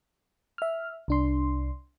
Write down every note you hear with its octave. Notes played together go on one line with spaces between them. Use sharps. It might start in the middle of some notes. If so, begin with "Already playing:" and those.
E5 F6
C2 D4 C6